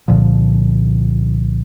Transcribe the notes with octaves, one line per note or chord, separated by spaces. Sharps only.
C2 A#2 D3 F3